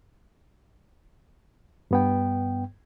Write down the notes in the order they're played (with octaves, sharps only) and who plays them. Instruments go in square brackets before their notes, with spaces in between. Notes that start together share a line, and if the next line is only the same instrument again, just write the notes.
[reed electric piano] G2 B3 G5